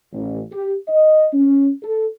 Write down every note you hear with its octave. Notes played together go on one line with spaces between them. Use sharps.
A1
G4
D#5
C#4
A4